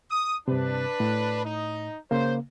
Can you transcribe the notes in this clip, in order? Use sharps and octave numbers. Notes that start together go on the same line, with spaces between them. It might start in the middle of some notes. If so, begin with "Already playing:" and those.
D#6
G2 C3 D4 B4
A2
D#4 D#5
C#3 A#3 C5